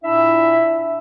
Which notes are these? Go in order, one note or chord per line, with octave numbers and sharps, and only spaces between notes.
A#2 D4 E4 E5